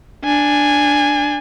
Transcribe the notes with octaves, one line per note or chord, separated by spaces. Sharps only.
D4 G#5